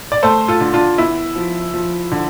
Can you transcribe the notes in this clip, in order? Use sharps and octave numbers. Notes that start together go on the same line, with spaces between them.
D5
A3 A4 C5
F4 A4
D3
D4 F4
B3 E4
F3
F3
D3